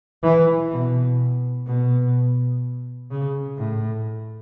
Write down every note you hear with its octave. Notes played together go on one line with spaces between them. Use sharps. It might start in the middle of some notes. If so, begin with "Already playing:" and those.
E3
B2
B2
C#3
A2